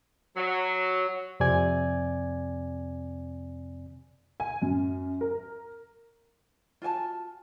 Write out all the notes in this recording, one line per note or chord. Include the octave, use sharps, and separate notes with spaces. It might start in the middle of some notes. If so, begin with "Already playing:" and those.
F#3
F2 C3 C4 D5 G#5 G#6
G#5
F#2
A#4
F4 F#4 G#5 A5